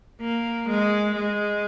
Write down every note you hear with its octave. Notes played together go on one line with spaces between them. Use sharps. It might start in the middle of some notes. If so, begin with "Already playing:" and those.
A#3
G#3
G#3